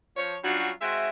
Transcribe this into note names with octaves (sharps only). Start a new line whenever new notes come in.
F3 C#5
F#3 G3 C#4 D4 F4 F#4
G#3 C4 F#4 E5